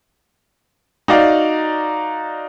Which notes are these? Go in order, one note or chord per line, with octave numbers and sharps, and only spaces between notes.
D#4 F#4 D5 F5